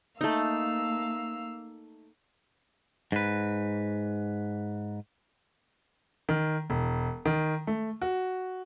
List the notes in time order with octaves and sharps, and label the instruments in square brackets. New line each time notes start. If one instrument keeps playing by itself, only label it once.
[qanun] A3 D#4 [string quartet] A#3 F5 E6
[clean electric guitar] G#2 B4
[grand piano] D#3
E1
D#3
A3
F#4